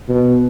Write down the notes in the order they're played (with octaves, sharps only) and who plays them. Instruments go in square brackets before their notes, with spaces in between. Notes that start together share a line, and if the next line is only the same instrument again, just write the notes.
[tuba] B2